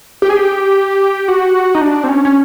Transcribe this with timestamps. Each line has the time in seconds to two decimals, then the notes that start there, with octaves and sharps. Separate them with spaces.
0.22 G4
0.29 G#4
0.37 G4
1.28 F#4
1.75 D#4
1.81 D4
2.04 C4
2.08 C#4
2.25 C#4